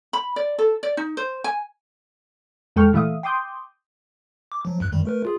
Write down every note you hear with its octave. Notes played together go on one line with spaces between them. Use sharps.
B5
D5
A4
D5
D#4
C5
G#5
E2 G#3 A4 G5 C#6 F6
A#2 E3 A3 E5 F5 D#6
G5 C6 D6 D#6 G6
D6
F3 F#3
D2 G2 F#6
F#2 D#3 G3
A3 A#4 B4
F4 G#4